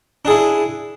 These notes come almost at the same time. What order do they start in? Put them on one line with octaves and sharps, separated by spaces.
D4 G#4 E4